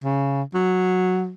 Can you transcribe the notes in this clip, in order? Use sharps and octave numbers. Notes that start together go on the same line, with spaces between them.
C#3
F#3